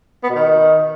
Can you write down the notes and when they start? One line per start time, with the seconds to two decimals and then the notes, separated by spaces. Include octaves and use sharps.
0.23 B3
0.29 B2
0.35 D#3